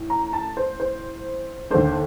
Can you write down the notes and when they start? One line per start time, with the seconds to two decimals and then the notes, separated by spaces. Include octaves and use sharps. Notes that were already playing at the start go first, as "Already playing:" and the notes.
Already playing: A2
0.10 A#5
0.33 A5
0.57 C5
0.80 C5
1.70 D#2 D3 A3 D4 C5